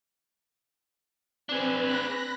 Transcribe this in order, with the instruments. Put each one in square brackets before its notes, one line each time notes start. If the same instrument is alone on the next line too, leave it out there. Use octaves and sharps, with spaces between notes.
[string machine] C4 B4 [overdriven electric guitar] D4 G#4
[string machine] B5 F#6 A#6